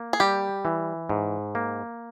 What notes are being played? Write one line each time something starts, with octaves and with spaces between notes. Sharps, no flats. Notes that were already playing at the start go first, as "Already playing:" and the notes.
Already playing: A#3
G#4
G3 G4
E3
G#2
A#3